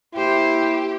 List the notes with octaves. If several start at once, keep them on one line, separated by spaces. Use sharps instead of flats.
A#3 E4 G4 C5